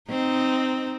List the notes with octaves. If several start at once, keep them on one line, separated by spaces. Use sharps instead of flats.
C4 D#4